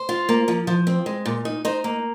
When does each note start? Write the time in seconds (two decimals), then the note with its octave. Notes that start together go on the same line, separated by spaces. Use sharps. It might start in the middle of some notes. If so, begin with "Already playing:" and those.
Already playing: C5
0.09 F4
0.29 A#3
0.48 F3
0.67 F3
0.87 C4
1.06 G#3
1.26 A#2
1.45 D#4
1.65 D#4 C5
1.84 A#3